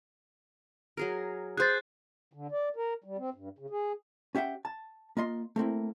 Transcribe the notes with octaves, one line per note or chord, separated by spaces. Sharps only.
F#3 G#4 A#4
G#4 C5 F#6 G6 A6
D3
D5
A#4
G3
C4
G2
C#3
G#4
C#4 G4 E5 F#5 G5
A5
A#3 F4 D#5 C6
A3 A#3 C4 E4